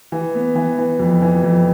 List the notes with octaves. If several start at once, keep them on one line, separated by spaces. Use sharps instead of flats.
E3
B3
E3
E3
F2
E3
F2